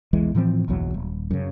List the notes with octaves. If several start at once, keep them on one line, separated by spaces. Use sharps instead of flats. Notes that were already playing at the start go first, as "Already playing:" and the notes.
B1 E2 E3 G#3
A2 E3 F3 C4
F#1 B1 E2 F#3
D#1
F#2 C#3